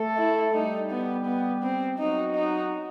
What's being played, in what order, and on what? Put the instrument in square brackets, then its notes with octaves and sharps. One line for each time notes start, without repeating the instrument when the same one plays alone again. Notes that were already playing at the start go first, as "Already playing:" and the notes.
Already playing: [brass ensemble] A3 A4
[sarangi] E4
[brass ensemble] G3 G4 [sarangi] D#4
[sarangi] B3
B3
C4
[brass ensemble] F#3 F#4 [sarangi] D#4
[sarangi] D#4